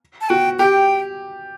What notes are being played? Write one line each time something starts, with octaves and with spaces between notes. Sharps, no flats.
A5
F#4 G5
G4 G5